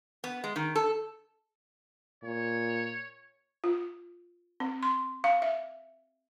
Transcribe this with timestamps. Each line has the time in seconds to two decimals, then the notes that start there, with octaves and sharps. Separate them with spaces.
0.24 B3
0.44 G#3
0.56 D#3
0.75 A4
2.24 A#2 C#5
3.64 F4
4.60 C4
4.83 C6
5.24 F5
5.42 E5